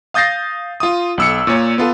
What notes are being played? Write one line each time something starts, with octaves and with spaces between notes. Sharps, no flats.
F5 D#6 G6 A6 A#6 C7
F4 D#6
B1 E6 C#7
A#2 C#5
B3 F4 A4